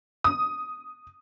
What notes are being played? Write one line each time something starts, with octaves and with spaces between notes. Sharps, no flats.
D#6